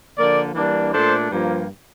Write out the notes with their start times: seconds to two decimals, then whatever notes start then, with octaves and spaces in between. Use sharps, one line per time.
0.17 D3 F3 A#3 A#4 D5
0.54 E3 G3 A#3 D4
0.91 A#2 A3 D4 A4 C5
1.30 G2 F3 A#3